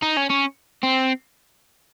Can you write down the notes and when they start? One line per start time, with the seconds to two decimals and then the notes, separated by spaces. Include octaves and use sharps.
0.02 D#4
0.17 C#4
0.30 C#4
0.83 C4